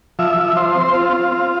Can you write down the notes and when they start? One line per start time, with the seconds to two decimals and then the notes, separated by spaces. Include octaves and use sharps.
0.19 F3 E5
0.38 F3
0.57 F3 C5
0.75 C4
0.94 C4 F4
1.13 C4
1.32 C4